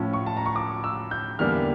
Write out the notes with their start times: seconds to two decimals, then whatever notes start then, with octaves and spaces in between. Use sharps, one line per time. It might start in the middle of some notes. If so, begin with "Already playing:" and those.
Already playing: A2 F3 C#4
0.13 C#6
0.26 A5
0.37 A#5
0.46 C#6
0.56 D6
0.84 E6
1.11 G6
1.39 E2 D3 G3 A#3 F6